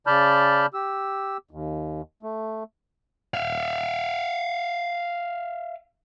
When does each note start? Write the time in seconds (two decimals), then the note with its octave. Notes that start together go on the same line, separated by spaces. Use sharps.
0.07 C#3 D5 A5 B5 F6 G6
0.74 G4 E6
1.51 D#2
2.23 A3
3.34 E5 F5